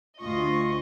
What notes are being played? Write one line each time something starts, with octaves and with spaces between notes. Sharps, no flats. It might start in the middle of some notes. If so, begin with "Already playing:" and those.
D2 F4 D#5 C#6